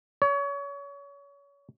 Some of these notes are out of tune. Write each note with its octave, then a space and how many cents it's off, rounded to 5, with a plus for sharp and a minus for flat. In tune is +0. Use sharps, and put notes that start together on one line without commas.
C#5 +30